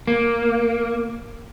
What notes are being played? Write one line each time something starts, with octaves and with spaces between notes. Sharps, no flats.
A#3